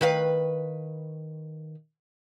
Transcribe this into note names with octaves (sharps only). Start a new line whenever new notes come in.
D#3 B4 F5